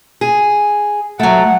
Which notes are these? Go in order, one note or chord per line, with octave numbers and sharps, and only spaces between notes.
G#4
F#3 A3 F#5